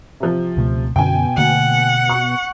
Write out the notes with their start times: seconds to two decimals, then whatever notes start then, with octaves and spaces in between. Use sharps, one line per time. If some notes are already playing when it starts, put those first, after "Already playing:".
0.20 C3 F3
0.57 C#2 B2 A3
0.96 F#2 B2 D3 C#4 G5 G#5
1.38 D3 A3 A#3 F#5
2.10 C#6